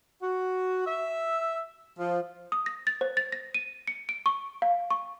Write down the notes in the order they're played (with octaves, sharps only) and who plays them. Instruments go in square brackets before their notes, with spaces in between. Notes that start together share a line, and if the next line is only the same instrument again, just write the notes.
[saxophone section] F#4
E5
F3
[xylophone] D#6
A#6
A6
C5
A6
A#6
D#7
C#7
D7
C#6
F5
C#6